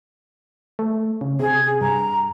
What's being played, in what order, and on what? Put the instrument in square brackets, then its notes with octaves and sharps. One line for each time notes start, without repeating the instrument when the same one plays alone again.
[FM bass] A3
C#3
[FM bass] C3 [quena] G#4
[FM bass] G2 [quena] A#5